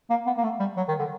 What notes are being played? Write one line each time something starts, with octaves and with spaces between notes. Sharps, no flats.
A#3
B3
A#3
A3
G3
F#3
D#3
D3